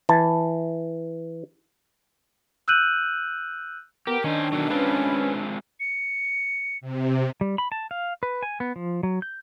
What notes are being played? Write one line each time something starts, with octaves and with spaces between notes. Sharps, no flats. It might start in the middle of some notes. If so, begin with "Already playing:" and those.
E3 A5
E6 F#6 G6 D#7 F#7
B3 G4 A#4
D#3 C#4 D4 C5
B2 D3 F#3
G#3 C4 C#4 F4 B4
C#7
C3
G3
B5
A5
F5
B4
G#5
B3
F3
F#3
G6